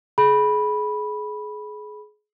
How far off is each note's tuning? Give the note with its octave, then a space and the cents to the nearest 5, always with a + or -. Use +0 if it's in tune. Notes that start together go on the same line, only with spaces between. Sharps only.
G#4 +30 B5 -10